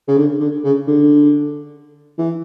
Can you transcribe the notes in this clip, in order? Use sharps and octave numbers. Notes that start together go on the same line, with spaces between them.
C#3
D3
D3
C#3
D3
E3